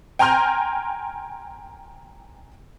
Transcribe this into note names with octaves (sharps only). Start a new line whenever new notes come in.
G5 G#5 A#5 C6 F6 G6